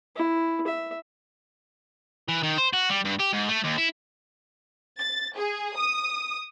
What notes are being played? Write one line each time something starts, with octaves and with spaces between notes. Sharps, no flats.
E4
E5
E3
D#3
C5
F#4
G3
G2
G4
G#2
A3
D#2
E4
A6
G#4
D#6